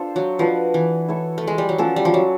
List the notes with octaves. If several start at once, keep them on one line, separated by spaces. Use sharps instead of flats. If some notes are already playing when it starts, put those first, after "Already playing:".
Already playing: D4 F4 A4 C5
F#3
F3 D4 F#4 B4 D#5
E3
E4 A4 C#5
A3
G#3
G3
F#3
F3 C#4 F#4 A4 D5
G3
F3
F#3